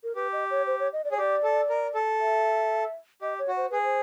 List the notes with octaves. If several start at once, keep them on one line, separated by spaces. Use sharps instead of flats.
A#4
G4 B4
D#5
C#5
C5
C#5
D#5
D5
G#4 C#5
G4 D5
A4
A#4
A4
E5
G4 D#5
C#5
F#4
C5
G#4 B4
C5